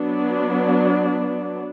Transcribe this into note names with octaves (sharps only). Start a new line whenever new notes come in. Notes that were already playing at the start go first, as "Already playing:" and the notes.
Already playing: F#3 B3 D4